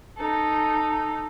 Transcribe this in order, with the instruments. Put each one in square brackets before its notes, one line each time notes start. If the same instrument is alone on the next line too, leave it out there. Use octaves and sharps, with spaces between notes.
[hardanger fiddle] D#4 A4